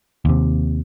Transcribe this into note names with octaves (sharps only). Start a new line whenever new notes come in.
D#2 C3